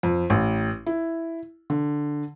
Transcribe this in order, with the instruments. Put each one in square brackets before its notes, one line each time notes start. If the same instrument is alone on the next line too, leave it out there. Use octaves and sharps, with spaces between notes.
[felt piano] F2
A1
E4
D3